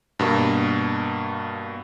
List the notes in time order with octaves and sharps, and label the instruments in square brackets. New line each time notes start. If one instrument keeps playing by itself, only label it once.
[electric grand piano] G2 B2 A#3